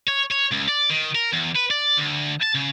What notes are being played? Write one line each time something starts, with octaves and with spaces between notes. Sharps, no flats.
C#5
C#5
C#2
D5
D#3
A#4
E2
B4
D5
D2
A5
C#3